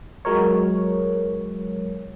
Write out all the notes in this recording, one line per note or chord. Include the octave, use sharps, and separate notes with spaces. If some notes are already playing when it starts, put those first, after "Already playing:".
F#3 G#3 A#4 C#5